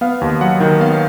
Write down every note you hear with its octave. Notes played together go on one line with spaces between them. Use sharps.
B3 F5
D#2
F#3 F#5
D#3
B3 F5